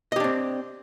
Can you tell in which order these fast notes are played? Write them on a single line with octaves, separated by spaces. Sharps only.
D#5 G4 D4 C4